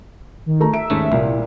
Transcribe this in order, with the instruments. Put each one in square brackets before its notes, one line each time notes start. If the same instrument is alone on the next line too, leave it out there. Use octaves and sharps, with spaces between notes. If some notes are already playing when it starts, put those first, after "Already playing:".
[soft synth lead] D#3
[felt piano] A3 A#5
[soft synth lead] E5 [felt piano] D7
[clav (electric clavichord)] D#2 G#2 A3 [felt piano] C#4
[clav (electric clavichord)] C2 [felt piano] A#2 E4